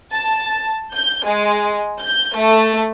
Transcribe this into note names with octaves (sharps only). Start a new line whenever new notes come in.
A5
G6
G#3
G6
A3